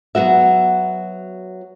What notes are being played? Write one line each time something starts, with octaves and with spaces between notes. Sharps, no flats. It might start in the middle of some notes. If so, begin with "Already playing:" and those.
F#3 B3 F#4 E5